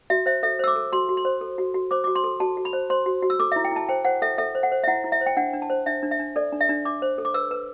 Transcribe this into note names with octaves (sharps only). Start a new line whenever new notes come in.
F#4 E5
C5 E5
A4 E5
C5 E6
D6
A4
F#4 C6
F#4
C6
C5
A4
F#4
F#4
C5 D6
F#4 D6
C6
A4
F#4 A5
F#4
B5
C5
C5 C6
F#4
F#4
E6
A4 D6
E4 E5
G5
E4 A5
C5 G5
C5 F#5
A4 E5
A4 E5
C5
F#5
C5
E5
E4 F#5
E4
E5
C5
G5
D4 F#5
D4
A5
C5
D4 E5
D4
E5
D4
A4 D5
D4
E5
D4
D4 D6
C5
A4
D6
B4 E6
B4